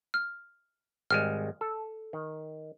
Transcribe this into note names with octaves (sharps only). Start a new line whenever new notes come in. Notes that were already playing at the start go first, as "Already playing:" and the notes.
F6
G#1 G3 G#3 F6
A4
D#3